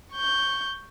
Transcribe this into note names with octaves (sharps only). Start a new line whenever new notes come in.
C#6 G6